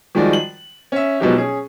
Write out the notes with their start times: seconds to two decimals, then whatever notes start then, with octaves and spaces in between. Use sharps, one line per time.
0.15 D#3 F3 G3 G#3 F#4 D5
0.33 F#7
0.92 C#4 E5
1.20 B2 F3 F#3 G#3 D#4 G4
1.38 C#4 G#4